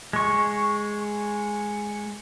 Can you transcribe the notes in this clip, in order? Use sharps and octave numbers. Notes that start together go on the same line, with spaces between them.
G#3 C#6